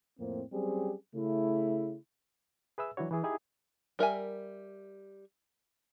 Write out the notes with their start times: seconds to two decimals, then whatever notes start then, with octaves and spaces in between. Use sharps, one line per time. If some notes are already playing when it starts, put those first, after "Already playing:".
0.19 F2 A2 A#3 C4
0.53 F#3 G3 C4 C#4 G4 G#4
1.15 C#3 A3 E4
2.78 G#4 B4 E5 E6
2.97 E3 F#3 D4 E4 F#4 C#5
3.11 E3 E4 G#4
3.23 D#4 E4 G4 G#4
3.99 G3 A#4 E5 G#5